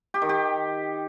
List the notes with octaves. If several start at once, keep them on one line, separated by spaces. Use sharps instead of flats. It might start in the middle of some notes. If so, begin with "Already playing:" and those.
G4
D#3
G4